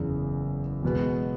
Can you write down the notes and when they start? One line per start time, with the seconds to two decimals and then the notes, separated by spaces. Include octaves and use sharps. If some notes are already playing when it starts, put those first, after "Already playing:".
Already playing: F#1 E2 C#3
0.83 E2 B2 G#3 B3